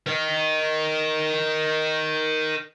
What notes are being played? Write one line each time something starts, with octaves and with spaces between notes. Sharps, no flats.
A#4 D#5